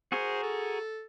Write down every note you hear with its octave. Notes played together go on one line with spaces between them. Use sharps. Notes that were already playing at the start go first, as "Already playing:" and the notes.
F#4 G#4 A#4 C5
A4